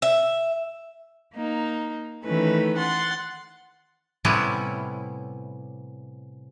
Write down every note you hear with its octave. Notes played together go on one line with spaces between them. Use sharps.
E5
A#3 D#4
D#3 E3 A3 C#4 B4
F#5 C6 A6
A2 C3 G3 B3 C#4 E4